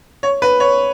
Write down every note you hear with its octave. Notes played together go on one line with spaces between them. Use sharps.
C#5
B4
C#5